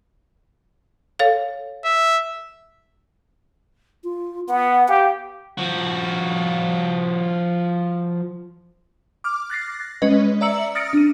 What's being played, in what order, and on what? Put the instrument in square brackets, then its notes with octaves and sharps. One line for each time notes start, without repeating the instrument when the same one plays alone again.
[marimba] A4 C#5 F5
[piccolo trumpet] E5
[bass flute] F4
[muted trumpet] B3 [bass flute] F#5
[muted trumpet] G4 [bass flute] F5
[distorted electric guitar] F3 F#4
[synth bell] D6 F6
F#6 A6 A#6 C7
G#3 C#4 B4 D#5
D5 E5 A#5 E6 C#7 F#7
D#6 F6 A6 A#6 C#7 D7
D4 D#7